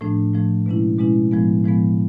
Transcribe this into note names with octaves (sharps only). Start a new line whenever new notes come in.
A2 F3 A3 D4
A2 F3 A3 D4
B2 G#3 C#4 E4
B2 G#3 C#4 E4
A2 F3 G#3 B3
A2 F3 G#3 B3